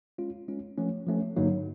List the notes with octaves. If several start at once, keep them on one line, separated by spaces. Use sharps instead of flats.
G#3 C#4 F4
G#3 C#4 F4
F3 A3 C#4
F3 A3 C#4
G2 D3 F#3 A#3 D#4